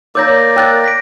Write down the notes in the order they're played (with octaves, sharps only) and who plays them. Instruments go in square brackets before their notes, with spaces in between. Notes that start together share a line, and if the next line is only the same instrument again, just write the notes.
[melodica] A#3 D5 [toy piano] A#4 C#5 A#5 [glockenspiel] D6 G6 A#6
[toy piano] A#4 [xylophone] G5 F#6 A6
[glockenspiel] A#6 B6 D7